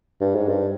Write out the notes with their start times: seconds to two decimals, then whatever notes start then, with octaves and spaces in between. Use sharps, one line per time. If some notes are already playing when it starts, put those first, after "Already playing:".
0.21 G2
0.35 G#2
0.49 G2